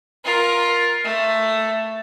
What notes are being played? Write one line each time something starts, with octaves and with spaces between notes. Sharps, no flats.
F4 A#4
A3